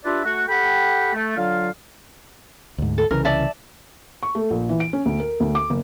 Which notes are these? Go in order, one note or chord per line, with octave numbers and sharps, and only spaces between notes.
D4 F4 G4 B4 D5 E5
A3 F#4
G4 A4 F#5 G5 B5
A3
D3 F#3 F4 F5
D2 G#2
A4
C2 C#3 E3 A#4
D5 E5 A5
C#6
A3
A#1
E3
D7
C#4
D2
A#4
D2
D6
F#1